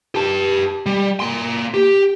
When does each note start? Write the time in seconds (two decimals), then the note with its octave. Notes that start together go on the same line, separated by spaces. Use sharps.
0.15 G4 A5
0.86 G3
1.20 A#3 C6
1.74 G4